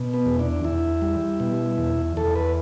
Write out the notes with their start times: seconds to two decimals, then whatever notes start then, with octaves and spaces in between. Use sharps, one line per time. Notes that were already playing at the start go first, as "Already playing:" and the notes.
Already playing: B2
0.14 B3
0.26 E2
0.39 D4
0.64 E2 E4
1.02 G3
1.40 B2
1.78 E2
2.17 E2 A4
2.36 B4